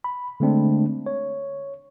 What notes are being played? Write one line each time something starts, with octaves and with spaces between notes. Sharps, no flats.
B5
D3 G#3 A3 C4 D4
C#5